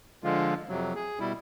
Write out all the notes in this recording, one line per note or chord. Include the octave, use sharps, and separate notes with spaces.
D3 F3 G#3 F4
F2 C3 F#3
G#4
B2 G3 E4